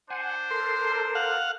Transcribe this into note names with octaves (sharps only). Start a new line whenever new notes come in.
D4 C5 F#5 G#5
A4 A#4 C6
F5 F#5